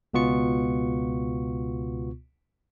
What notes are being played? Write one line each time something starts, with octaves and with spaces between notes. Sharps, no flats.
C#2 B2 B3 F4 C#6 C#7